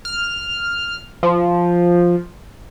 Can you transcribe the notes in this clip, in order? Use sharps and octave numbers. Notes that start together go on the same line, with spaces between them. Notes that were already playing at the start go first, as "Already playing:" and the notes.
F6
F3